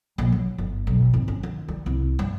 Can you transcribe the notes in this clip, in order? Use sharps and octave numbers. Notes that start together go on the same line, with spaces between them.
A#1
F#3
G1
B1
G#1
C#4
D#3
G3
C2
G2